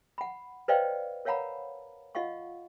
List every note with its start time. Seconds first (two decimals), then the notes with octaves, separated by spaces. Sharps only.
0.18 F#5 B5
0.68 B4 C5 D5 D#5 F5 G5
1.25 A#4 C#5 F5 F#5 A#5 B5
2.15 F4 D#5 F5 F#5 C#6